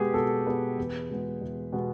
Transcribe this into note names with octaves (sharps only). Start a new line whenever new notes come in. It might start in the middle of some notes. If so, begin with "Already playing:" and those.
Already playing: B2 G#3 B3 G4 G#4
B2 A4
G#3 B3 B4
E2
B2 G#3 B3
E2
B2 G#3 B3